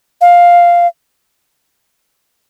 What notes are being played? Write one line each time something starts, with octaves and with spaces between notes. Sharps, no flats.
F5